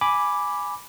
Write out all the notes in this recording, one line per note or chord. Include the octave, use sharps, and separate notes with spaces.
G#5 B5 D6